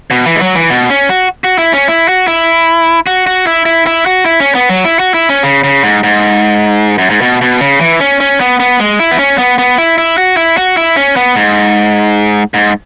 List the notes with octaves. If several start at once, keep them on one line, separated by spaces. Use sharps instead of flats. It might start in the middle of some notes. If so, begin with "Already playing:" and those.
B2
E3
G#3
F#3
E3
B2
C#4
F#4
F#4
E4
C#4
E4
F#4
E4
F#4
F#4
E4
E4
E4
F#4
E4
C#4
B3
F#3
E4
F#4
E4
C#4
C#3
C#3
G#2
G#2
F#2
G#2
B2
B2
C#3
E3
C#4
C#4
B3
B3
G#3
E4
B3
C#4
B3
B3
E4
E4
F#4
E4
F#4
E4
C#4
B3
G#2
G#2